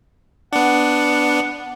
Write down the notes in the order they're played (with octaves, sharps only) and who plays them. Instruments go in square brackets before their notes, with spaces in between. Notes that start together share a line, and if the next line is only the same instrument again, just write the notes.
[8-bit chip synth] B3 D4 [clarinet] F#5